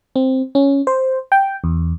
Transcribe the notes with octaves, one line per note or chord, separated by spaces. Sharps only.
C4
C#4
C5
G5
E2